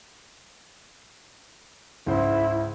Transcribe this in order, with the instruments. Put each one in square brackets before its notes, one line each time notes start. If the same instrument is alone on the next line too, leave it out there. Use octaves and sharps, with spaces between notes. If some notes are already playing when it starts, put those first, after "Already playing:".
[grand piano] C#2 G#2 C5 [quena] E4